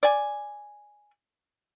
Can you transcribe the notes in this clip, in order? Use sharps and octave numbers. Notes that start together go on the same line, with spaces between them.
D5 G#5